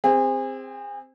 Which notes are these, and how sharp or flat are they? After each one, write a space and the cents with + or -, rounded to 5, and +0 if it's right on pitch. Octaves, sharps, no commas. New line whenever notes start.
C4 +0 G#4 -35